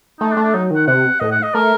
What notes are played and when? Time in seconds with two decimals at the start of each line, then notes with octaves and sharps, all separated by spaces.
0.20 A3 D#4
0.32 D4
0.37 A3
0.43 D4
0.54 F#3 D#4
0.71 D#3 F#5
0.87 C3 F#5
1.20 A2 D#5
1.32 F#5
1.43 D#5
1.54 A3 A#4